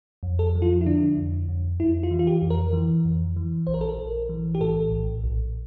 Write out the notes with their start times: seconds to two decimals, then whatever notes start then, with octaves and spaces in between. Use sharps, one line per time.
0.23 F2
0.39 A4
0.55 F3
0.62 F4
0.81 E4
0.86 D3 D4
1.17 F2
1.48 F2
1.80 F2 E4
2.03 F4
2.11 E3
2.19 F4
2.27 G4
2.42 F2
2.50 A#4
2.73 E3
3.05 F2
3.36 E3
3.67 A#1 C5
3.74 A#4
3.81 A4
3.89 A#4
3.98 A#1
4.29 E3
4.55 G4
4.61 A2 A4
4.92 A#1
5.24 A#1